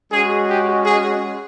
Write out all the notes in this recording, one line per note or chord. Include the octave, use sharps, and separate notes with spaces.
G#3 C#4 F#4 G#4
G4
G#4